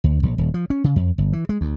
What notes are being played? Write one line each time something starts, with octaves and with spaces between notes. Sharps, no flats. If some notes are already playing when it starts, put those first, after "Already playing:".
D2
A#1
D#1
F3
C#4
C#3
F2
G1
E3
G#3
D2